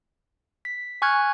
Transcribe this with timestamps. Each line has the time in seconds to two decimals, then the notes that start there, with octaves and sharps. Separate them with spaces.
0.65 B6
1.02 G#5 C#6 F6 F#6 G#6